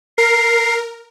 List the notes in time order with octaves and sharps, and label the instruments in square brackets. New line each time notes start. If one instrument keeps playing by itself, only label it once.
[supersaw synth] A#4 [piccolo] C7